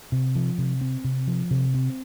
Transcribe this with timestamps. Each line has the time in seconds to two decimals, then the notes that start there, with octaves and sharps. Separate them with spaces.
0.12 C3
0.36 F3
0.58 C3
0.81 C4
1.04 C3
1.27 F3
1.51 C3
1.74 C4